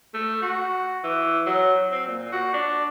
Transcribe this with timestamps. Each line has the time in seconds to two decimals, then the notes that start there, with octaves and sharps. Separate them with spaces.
0.14 A3
0.42 F#4
1.04 E3
1.46 F#3
1.91 C4
2.06 A#2
2.32 F#4
2.53 D4